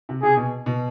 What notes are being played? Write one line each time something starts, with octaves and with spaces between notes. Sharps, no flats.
C3
C3 G#4
B2
B2